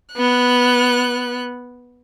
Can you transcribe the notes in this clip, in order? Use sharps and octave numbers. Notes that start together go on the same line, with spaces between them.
B3 F#6